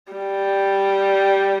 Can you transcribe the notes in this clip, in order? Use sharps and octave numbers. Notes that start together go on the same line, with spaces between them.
G3